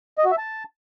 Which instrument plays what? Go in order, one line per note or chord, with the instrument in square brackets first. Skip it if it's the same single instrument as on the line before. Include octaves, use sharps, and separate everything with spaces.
[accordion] D#5
F#4
E5
A5